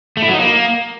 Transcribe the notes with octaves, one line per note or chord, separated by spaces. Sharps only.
A3
E4
F#3
D#4
A#3